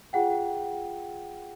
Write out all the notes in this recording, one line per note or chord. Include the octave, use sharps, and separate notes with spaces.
F4 G#4 F#5 G5